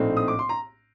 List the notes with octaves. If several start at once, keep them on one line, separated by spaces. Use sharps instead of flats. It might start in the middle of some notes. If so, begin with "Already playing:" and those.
Already playing: A#1 A2 A3 C4 D#4
D#6
D6
C6
A#5